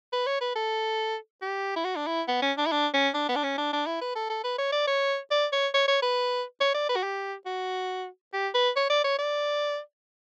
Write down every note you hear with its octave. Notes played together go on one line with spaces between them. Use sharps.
B4
C#5
B4
A4
G4
E4
F#4
D4
E4
B3
C#4
D4
E4
D4
C#4
D4
B3
D4
C#4
D4
D4
E4
B4
A4
A4
B4
C#5
D5
C#5
D5
C#5
C#5
C#5
B4
C#5
D5
B4
F#4
G4
F#4
G4
B4
C#5
D5
C#5
D5